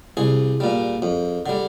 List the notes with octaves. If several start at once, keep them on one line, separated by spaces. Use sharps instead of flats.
C2 G#4
A#2 G3
F2
D3 G3